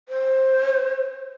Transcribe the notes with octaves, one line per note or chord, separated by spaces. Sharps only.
C5